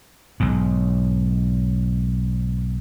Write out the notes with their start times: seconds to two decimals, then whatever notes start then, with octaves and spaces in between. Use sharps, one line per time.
0.40 B1 G#2